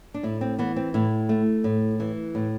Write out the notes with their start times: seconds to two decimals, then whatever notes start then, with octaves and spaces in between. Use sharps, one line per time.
0.14 D4
0.23 A2 E4
0.41 C4
0.59 E3 B3
0.76 C4
0.94 A2 E4
1.29 A3
1.64 A2
2.00 E3
2.35 A2